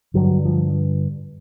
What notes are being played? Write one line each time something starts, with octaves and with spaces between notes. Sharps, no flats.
G2 D3 F#3
F3